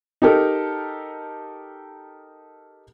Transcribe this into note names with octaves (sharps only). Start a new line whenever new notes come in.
D#4 G4 A4 A#4